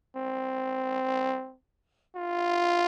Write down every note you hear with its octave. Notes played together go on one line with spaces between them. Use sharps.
C4
F4